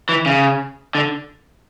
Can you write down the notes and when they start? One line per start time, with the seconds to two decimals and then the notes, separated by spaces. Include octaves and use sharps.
0.09 E3
0.26 C#3
0.95 D3